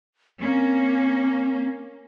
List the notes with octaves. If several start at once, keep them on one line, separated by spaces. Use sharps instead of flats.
A#3 C4 C#4